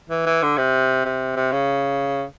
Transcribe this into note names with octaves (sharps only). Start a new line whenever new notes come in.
E3
E3
D3
C3
C3
C3
C#3